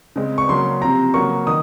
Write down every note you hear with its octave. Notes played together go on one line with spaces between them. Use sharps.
C#3 G#3 C4
C#6
C#3 F#3 A#3 C#4 C6
C3 F3 C4 A#5
C#3 F#3 A#3 C#6
D#3 D#6